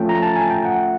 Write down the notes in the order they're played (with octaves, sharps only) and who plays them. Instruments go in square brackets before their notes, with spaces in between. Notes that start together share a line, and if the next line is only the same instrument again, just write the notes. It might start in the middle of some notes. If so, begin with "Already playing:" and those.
Already playing: [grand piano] F3 A3 C#4 [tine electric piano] G5
[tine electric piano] A#5
A5
G#5
G5
F#5